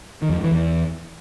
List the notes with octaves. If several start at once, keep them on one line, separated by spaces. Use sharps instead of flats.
D#3
F2
G#2
E3
E2